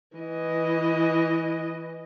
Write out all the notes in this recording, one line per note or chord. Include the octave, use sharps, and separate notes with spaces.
E3 D#5